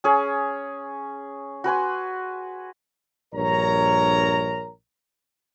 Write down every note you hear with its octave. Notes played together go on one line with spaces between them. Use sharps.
C#4 G#4 C#5
F#4 B4 G#5 C6
A#1 G2 A#4 C#5 A#5